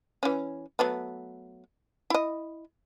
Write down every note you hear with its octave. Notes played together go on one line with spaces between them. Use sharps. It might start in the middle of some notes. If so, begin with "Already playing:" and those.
E3 C#4
F#3 A3 B3
E4 D#5